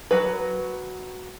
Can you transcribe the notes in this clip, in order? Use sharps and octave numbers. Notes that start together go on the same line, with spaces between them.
F#3 B4